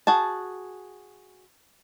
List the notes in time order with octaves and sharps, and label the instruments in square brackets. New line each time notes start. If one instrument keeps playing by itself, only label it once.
[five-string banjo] F#4 G#4 A5